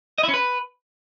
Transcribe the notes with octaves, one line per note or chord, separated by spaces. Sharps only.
D#5
E4
C#4
B4